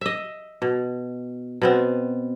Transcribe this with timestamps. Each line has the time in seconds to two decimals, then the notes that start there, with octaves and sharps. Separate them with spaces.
0.01 D#5 E5
0.62 B2
1.62 B2 B3 C4